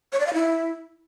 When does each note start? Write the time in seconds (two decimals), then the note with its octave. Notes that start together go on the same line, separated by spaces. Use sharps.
0.13 C#5
0.20 D5
0.27 F5
0.34 E4